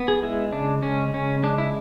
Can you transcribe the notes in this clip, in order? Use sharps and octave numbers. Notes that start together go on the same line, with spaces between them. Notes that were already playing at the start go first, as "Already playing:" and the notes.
Already playing: B3
G#4
G#3 E4
C#3 D4
G#3 C#4
C#3 C#4
G#3 D4
E4